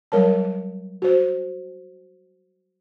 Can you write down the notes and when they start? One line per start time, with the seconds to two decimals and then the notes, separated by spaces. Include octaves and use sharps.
0.12 F#3 G3 A#4 C#5 A5
1.02 F#4 C5